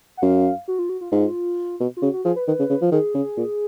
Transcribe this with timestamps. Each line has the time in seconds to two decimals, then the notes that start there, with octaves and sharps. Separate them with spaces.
0.17 F#5
0.22 F#2 F5
0.68 F#4
0.79 F4
0.89 F#4
1.01 F4
1.12 G#2 F4
1.80 B2
1.97 F4
2.02 C#3 F#4
2.13 F#4
2.25 F3 G#4
2.36 B4
2.48 D#3 B4
2.59 C#3
2.70 C#3
2.82 F3
2.92 D#3 G#4
3.15 C#3
3.37 A#2